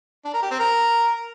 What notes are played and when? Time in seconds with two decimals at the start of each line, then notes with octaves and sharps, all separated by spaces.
0.25 D4
0.33 A#4
0.42 G4
0.51 C4
0.59 A#4